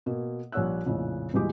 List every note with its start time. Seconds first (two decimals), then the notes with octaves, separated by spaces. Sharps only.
0.06 B2 A#3
0.52 A#1 G3 C#5 F#5 E6 F#6
0.86 A#1 F2 A2 C#3
1.34 D#1 B2 E3 G#3 G4 D6